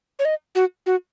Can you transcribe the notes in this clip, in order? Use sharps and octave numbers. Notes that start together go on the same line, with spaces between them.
C#5
D#5
F#4
F#4